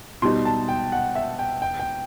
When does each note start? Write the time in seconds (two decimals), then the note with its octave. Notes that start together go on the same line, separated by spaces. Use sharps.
0.22 B2 G3 D#4 C6
0.45 A5
0.69 G5
0.92 F#5
1.15 E5
1.39 G5
1.62 G5
1.80 G5